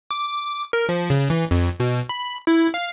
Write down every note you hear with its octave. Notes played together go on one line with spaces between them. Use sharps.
D6
A#4
F3
C#3
E3
F2
B2
B5
E4
F5